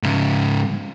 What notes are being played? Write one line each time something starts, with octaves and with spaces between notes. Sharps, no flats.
G#2 C#3